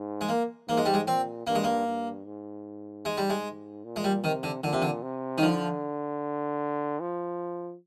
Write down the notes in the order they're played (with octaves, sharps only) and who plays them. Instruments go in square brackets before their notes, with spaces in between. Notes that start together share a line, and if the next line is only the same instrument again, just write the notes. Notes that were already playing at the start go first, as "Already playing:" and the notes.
Already playing: [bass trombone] G#2
[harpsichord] G#3
A#3
[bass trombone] G#2 [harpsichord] A#3
[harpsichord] G#3
G3
G#3
[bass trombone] A#2 [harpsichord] C4
[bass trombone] G2 [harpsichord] A#3
[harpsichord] G#3
A#3
[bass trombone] G2
G#2
[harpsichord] G#3
G3
G#3
[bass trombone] A#2
[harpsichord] G#3
G3
[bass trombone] C3 [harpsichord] D#3
[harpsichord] D3
[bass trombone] A#2 [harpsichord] D3
[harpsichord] C3
D3
[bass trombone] C3
[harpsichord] D#3
[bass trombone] D3 [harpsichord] F3
[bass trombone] F3